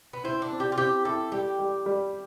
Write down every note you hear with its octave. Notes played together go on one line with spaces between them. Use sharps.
B3
C4 E4
D4
C4
G4
F4
C4 G4
E4 A4
G3 G4
G3
G3